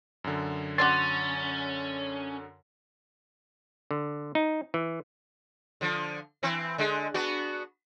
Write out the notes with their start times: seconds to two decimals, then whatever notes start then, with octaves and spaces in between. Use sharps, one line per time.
0.24 F#2 D3
0.78 C#4 F#4 D5 C6 A6
3.91 D3
4.35 D#4
4.74 E3
5.81 D3 F3
6.43 E3 C4
6.78 D3 G#3
7.14 B3 D4 F#4